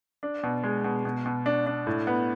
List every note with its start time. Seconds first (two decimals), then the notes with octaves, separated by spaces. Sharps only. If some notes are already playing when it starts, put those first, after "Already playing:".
0.23 D4
0.43 B2
0.63 G#3
0.84 B2
1.05 B2
1.26 B2
1.46 D4
1.66 D4
1.87 A2
2.07 B3